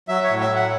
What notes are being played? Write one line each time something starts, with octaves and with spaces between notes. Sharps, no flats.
F#3 E5
C#5
A2
E5
F#3 F#5